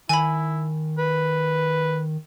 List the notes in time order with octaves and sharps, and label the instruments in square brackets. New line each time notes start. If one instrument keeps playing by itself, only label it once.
[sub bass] D#3 [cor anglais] E4 [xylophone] G#5 B5
[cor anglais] B4